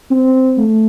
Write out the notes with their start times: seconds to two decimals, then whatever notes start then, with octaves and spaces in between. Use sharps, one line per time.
0.11 C4
0.58 A3